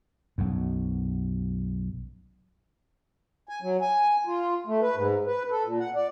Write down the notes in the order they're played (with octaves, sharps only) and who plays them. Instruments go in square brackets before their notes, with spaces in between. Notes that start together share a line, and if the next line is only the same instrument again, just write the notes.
[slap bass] B1 F#2
[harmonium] G#5
F#3
G#5
F4
A3
B4
G#2
B4
A4
A#2
F#5
D5